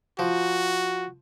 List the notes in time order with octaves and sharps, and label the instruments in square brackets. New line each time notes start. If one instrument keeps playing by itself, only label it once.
[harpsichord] F3 [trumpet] F#4